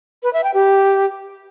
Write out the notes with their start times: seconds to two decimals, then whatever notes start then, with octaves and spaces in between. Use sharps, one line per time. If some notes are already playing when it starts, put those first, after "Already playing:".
0.23 B4
0.33 E5
0.44 G5
0.54 G4